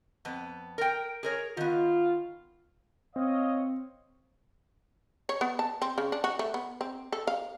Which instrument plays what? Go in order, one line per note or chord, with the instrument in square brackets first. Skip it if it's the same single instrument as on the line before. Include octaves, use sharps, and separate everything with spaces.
[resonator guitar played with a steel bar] F2 B3
A#4 G5
G#4 A#4 C#5
[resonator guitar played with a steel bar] D#3 B3 [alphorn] F4
[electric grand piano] C4 [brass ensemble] C#5 D#5 F5
[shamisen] C#5
B3
A5
C4
C#3
D4
F#4
A3
B3
C4
A4
F5